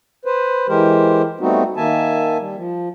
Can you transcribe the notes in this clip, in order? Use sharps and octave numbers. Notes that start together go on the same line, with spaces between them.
B4 C5
E3 G#3 G4 A#4 C5
G3 A3 B3 C4 D#4 F#4
D#3 A#3 E5 G#5 A5
G3
F3